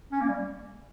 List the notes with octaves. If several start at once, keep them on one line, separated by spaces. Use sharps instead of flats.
C#4
A#3
G3